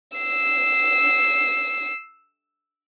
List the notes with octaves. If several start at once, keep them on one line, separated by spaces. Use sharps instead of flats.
E6 C7